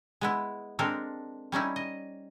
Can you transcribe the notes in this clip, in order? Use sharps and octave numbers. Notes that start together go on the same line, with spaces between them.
G#3 B3 E4
G#3 C4 D4 A4 A#4
G3 C#4 D#4 E4
D#5